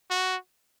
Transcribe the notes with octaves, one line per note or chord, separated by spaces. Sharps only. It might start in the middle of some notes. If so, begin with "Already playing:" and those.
F#4